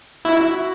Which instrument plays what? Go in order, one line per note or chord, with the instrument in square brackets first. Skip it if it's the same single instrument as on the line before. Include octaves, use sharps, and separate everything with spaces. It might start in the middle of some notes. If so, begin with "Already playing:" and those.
[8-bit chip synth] E4 [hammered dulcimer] F#4